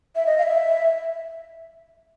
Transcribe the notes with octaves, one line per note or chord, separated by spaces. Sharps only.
E5
D#5
F5
E5